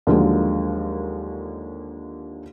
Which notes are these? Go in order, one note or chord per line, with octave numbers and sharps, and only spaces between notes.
D#2 D3 F3 F#3 G#3 A#3